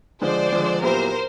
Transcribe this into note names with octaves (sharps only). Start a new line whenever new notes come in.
D3 F3 G#3 C5 D5
D3 F3 G#3
A#2 F#3 B3 E4 G4 A#4 C5